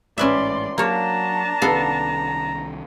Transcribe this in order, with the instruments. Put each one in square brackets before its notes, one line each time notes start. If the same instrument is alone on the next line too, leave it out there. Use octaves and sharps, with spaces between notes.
[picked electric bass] A1 G#2 [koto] C#4 B4 E5 [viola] D5 C6
[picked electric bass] F#3 [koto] A#3 C#5 [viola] D4 A5 [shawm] A#5
[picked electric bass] C2 D#3 C#4 [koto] B3 A4 F5